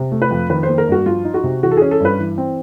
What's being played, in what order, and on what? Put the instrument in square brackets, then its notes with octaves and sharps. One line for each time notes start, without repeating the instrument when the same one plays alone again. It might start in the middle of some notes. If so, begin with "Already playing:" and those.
Already playing: [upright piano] C3
A3
B4
F2
D#3 B4
C5
A#3
A#4
G2 F#4
F3 F4
D#4
F#4
C3
E3 F#4
A4
C#4 G#4
A4
G2 B4
E3
C4